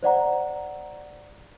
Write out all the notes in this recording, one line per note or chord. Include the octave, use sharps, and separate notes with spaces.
C5 D5 F#5 A#5